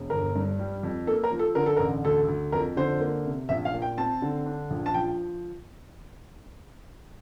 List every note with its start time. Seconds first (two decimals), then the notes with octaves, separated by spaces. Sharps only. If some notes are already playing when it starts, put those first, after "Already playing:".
Already playing: E1
0.10 G1 A#4
0.35 G2
0.59 G3
0.83 F2
1.07 A#3 A4
1.24 A#4
1.31 F3
1.39 A4
1.55 D3 A#4
1.66 A4
1.77 A1 A#4
2.04 D2 A4
2.28 D2
2.52 F2 A#4
2.77 D3 C5
3.01 A#3
3.25 C3
3.49 A#1 E5
3.65 F5
3.74 A#2
3.82 G5
3.97 C4 A5
4.22 D3
4.46 D4
4.70 A#1
4.86 A5
4.94 F3 G5